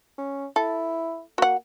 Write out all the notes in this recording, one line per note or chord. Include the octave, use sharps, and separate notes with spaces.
C#4
E4 A4
A#3 F#4 F#5